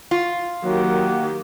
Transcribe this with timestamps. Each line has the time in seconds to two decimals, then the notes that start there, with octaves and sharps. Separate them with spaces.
0.11 F4
0.64 D#3 F#3 A#3 G4 F#5